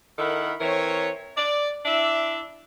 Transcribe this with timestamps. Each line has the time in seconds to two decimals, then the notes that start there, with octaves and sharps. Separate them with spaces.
0.18 D#3 E4 A4 A#4 F#5 B5
0.60 E3 C4 A#4 C#5
1.37 D5
1.86 D4 E4 D5 E5